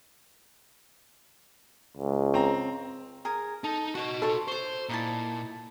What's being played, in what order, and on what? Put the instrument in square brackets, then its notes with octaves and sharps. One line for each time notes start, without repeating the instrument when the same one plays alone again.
[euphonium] C#2
[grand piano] C4 A#5
[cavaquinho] G#4 A#4 A#5
[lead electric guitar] D#4 [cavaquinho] A4
[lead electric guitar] F#4 D#5 [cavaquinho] C#5 F#5
[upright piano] A4 [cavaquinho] C#5 C6
[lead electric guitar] C5 [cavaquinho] C#5 C#6
[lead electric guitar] A#2 [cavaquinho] D#4 E4 A5